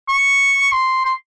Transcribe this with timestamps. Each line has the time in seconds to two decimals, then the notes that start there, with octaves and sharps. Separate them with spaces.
0.08 C#6
0.72 C6
1.05 C6